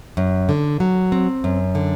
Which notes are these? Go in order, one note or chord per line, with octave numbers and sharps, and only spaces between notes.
F#2
D3
F#3
C4
F#2
D3